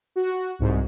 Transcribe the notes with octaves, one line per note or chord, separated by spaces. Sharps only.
F#4
C2 G#2